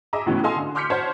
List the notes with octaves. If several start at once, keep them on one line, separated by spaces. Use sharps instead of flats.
G#4 D#5 E5 A#5 D6
C#2 A2 E3 B3 C#4
A4 D#5 F5 G#5 C6 D#6
D3
C6 D6 F6 G6 B6 C#7
C5 C#5 F#5 A5 B6